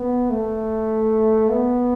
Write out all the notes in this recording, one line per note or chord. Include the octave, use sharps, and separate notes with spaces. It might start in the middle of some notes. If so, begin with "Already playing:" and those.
Already playing: B3
A3
B3